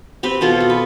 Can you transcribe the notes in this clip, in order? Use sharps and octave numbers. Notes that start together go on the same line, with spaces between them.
C4 G4 B4
B2 F4 A4
B2
B4